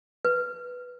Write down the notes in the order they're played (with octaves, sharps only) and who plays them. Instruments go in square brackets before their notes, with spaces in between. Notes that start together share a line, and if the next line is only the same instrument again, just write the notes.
[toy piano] B4